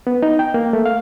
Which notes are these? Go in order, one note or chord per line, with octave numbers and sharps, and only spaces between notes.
B3
D#4
G5
A#3
A3
F5